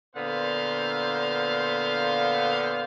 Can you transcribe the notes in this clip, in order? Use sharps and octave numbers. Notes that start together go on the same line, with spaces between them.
A#2 D3 B3 C5 F5